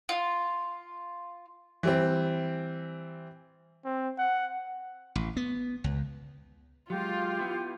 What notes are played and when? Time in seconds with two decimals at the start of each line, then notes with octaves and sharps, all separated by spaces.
0.09 F4
1.83 E3 G3 C4
3.85 C4
4.18 F#5
5.15 A1
5.37 B3
5.84 C#2
6.90 F#3 G#3 F4 G4
7.39 B3 E4